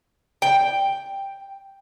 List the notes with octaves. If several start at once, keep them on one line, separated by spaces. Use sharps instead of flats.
G5